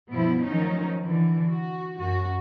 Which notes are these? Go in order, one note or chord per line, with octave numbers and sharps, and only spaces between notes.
G2 B2 F3 B3 E4
D#3 F3 F#3 A3 C#4 D#4
D3 E3
F#4
F#2 F#4